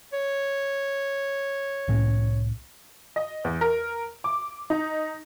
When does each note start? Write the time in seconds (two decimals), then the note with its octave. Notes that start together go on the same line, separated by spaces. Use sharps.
0.13 C#5
1.88 C2 A2 C#4
3.16 D#5
3.44 E2
3.61 A#4
4.24 D6
4.70 D#4